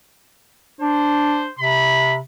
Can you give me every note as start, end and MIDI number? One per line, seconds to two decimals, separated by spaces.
0.81 1.47 62
0.81 1.52 72
1.59 2.19 48
1.59 2.17 83